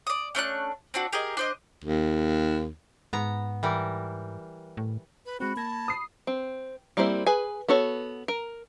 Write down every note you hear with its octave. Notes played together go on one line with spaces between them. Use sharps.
D5 D#6
A3 C#4 D4 F#6
C4 D4 F#4
G4 G#4 A#4 D#5
D4 C5 D#5
D#2
G#2 B3 A#5
E3 G3 A#4
A2
B4
G#3 C4 F#4 B5
A#3 A5 G#6 A#6
D#6 C7
C4
G3 A#3 C4 E4 C5
G#4 B4 G#5
B3 F#4 A4 C#5
A#4